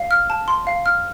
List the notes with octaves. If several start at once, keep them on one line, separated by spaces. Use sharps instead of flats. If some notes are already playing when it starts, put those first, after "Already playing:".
Already playing: F5
F6
A5
C6
F5
F6